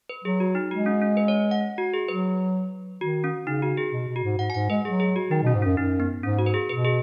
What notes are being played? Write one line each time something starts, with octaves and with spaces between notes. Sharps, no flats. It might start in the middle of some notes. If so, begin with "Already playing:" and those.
B4
F#3 G#4
F#4
D#4
G#3 F#4
C#4
C#4
B4
C#5
F#5
F#4
G#4
F#3 B4
D#3 F#4
C#4
C#3 D#4
F#4
G#4
B2
B2
F#4
G#2
G#2 F#5
G#5
G#2 F#5
G#3 B4
F#3 G#4
G#4
F#4
D#3 D#4
B2
C#4
G#2
F#2 C#4
F#2 D#4
B3
G#2 C#4
F#4
B4
G#4
B2 B4
G#4